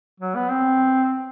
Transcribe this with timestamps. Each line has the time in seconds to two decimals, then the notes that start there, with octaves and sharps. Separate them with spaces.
0.20 F#3
0.36 B3
0.50 C4